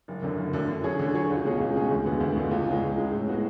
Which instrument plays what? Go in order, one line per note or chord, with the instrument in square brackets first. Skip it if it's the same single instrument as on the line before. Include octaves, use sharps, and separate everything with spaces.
[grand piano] F#1
F#2 D3
F#1
F#2 D3
D3
F#3 C#4 G#4 C#5
D3
F#3 C#4 G#4 C#5
C#2
B2 G#3 C#4 G#4
C#2
B2 G#3 C#4 G#4
D2
D3 G#3 B3
D2
D3 G#3 B3
C#2
C#3 G#3
C#2
C#3 G#3
A2
G#3 B3 F#4